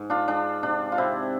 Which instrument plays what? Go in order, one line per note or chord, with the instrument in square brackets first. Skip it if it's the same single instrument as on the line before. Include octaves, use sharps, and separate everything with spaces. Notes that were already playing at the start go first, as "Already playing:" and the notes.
Already playing: [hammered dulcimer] G#2
D4 F4
G#3 D4
C3 D4
F4
C3 C4 E4